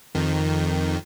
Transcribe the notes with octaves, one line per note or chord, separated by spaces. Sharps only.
F2 D#3